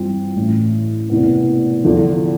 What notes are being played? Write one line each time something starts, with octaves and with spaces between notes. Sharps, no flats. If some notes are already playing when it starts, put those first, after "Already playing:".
Already playing: G2 E3 G3 C4 F4
A1 A2 E3
E1 E2 C3 E3 B3
E2 D3 F3